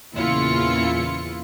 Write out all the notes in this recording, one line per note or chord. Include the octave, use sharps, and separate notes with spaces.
E2 A#2 C#3 E4 F4 C#7